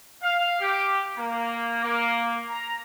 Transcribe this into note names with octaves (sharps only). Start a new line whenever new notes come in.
F5
G4
A#3
A#3
A#5